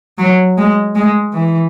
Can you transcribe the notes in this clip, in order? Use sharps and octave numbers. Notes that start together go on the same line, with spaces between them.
F#3
G#3
G#3
E3